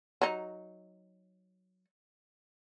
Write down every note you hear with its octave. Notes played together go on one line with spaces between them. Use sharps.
F#3 D#4